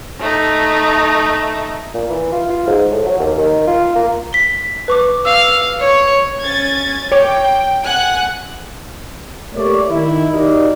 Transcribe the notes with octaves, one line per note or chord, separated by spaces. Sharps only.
A3 D#4
A#2
E3
F4
F4
G#2
A2
F#3
D#2
D#3
F4
A#3
B6 G7
B4 C#6 D6
F5 E6
C#5
C#4 G#6 A6
C#5 G5 D6
F#5 G#5 F#6
A3 A#3 G4 C#5 D5
D#3 E4
D#4 F#4 G4 A#4 D5 D#5